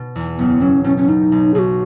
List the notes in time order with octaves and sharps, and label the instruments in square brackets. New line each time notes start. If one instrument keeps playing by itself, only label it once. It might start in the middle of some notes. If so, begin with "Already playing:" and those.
Already playing: [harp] B2
E2
[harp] F#1 [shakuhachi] B3
[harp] F#3 [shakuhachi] C#4
[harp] B2 [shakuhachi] C#4
[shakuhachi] C#4
[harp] B2 [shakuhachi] D#4
[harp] B1
[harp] B1 [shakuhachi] F#4 G#4